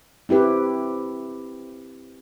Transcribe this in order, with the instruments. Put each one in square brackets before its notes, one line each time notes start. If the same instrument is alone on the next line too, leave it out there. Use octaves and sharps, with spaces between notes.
[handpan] C4 E4 G4 B4